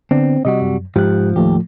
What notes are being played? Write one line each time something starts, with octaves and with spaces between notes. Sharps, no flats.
D3 B3 C4 D4
C3 G3 F#4 D#5
F#2
G#2 F3 G4 F#6
D#2 A2 F3 A3 G4